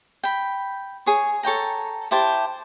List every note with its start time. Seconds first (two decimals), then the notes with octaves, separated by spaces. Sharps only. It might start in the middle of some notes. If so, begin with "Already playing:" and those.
0.23 G5 B5
1.06 G#4 C#5
1.43 A4 C#5 G5 A#5
2.11 E4 G4 C5 A5